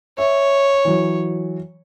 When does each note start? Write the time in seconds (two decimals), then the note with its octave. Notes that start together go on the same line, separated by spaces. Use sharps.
0.18 C#5 E5
0.85 E3 F#3